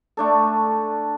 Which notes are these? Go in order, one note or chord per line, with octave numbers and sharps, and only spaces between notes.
A3 D4 A4